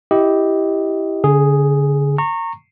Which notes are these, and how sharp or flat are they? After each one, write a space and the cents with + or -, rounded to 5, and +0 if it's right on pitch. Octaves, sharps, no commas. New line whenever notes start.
E4 +0 G4 +0 D#5 +15
D3 -35 G#4 +0
A#5 -25 C#6 -20